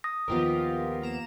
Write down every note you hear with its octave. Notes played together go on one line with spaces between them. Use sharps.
D#6 A#6
D#2 F3 B3 F4 G4 A#4
A#3 A#5 E7